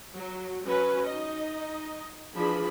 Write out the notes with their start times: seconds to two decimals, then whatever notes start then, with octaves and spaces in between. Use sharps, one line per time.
0.15 F#3
0.66 F#3 C#4 B4
1.07 D#4 D#5
2.35 E3 F3 D4 F4 G#4 B5